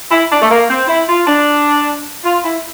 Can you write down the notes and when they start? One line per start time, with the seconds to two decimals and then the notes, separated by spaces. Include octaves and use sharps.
0.10 E4
0.31 D4
0.40 A3
0.50 A#3
0.70 C4
0.88 E4
1.08 F4
1.27 D4
2.24 F4
2.44 E4